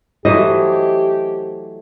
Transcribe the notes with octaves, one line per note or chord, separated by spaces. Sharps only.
E3 F#3 A3 G4 C5 D#5